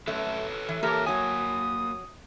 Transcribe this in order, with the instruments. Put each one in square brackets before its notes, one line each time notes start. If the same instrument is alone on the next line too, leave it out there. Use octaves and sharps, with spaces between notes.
[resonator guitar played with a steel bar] F#2 A3 [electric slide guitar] A4 B4 C#5
[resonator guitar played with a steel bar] E3
[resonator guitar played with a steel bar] E3 G4 A4 [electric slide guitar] A#3 C#5 [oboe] A#4
[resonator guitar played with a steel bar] F#3 G#5 [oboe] D#6